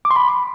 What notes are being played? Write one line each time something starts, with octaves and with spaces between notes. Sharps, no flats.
D6
C6
B5